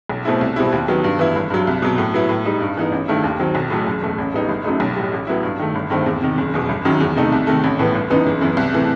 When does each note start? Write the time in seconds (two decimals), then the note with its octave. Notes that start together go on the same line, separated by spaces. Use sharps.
0.09 B1
0.25 B2 A3 C4 E4
0.41 C2
0.56 B2 G3 C4 E4
0.72 D#2
0.88 D#3 F#3 B3
1.04 G2
1.19 E3 B3 E4
1.36 G1
1.50 G2 F#3
1.67 C2
1.82 B2 F#3
1.98 A2
2.14 F#3 B3 E4
2.29 A2
2.45 G3 D#4
2.61 G2
2.77 E3 B3 D#4
2.92 A1
3.08 G2 D#3 A3 E4
3.24 D#2
3.39 D#3 F#3 C4
3.55 B1
3.70 A2 F#3 A3
3.87 F#1
4.02 E2 B2 A3
4.18 A1
4.33 A2 G3 B3 D#4
4.49 G1
4.64 F#2 F#3 A3 D#4
4.80 B1
4.96 A2 G3
5.12 A1
5.27 A2 F#3 B3 E4
5.43 G2
5.60 D#3 A3
5.75 G1
5.90 G2 D#3 A3 C4
6.06 E2
6.22 C3 D#3
6.38 F#1
6.54 E2 B2
6.69 G1
6.85 F#2 D#3 F#3
7.00 E2
7.16 C3 D#3 A3 D#4
7.32 C2
7.47 C3 D#3 A3
7.64 A1
7.79 A2 E3 B3
7.95 G1
8.10 F#2 E3 B3 D#4
8.27 F#1
8.41 F#2 E3 B3
8.57 C2
8.73 C3 E3 A3